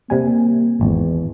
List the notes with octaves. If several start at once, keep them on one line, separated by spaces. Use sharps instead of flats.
C3 G3 A#3 G#5
G#1 E2